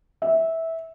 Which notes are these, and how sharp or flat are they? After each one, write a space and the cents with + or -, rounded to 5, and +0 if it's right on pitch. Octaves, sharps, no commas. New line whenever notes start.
E5 -15